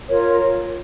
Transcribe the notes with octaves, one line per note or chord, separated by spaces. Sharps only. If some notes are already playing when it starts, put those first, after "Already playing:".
F4 A#4 C#5